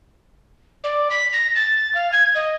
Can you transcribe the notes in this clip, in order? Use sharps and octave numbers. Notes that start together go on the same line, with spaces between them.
D5
B6
A#6
A6
F5
G#6
D#5